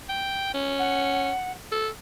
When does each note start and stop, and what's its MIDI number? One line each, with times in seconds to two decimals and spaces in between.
0.09 0.50 79
0.54 1.32 61
0.78 1.52 78
1.72 1.89 69